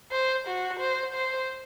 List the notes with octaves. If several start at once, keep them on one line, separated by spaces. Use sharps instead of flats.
C5
F#4
C5
C5